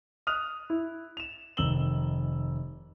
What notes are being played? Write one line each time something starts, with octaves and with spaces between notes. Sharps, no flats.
D#6 F6 F#6 F7
E4
E7 F7
F1 D#3 E6 E7 F#7 G7